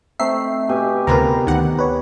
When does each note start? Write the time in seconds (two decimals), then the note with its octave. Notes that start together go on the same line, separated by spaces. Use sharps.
0.20 A3 C4 D#4 E5 C7
0.69 B2 G4 G#5
1.07 D2 C3 F4 A#4 B4 A#5
1.47 D2 D#3 F#5
1.79 B4 C#5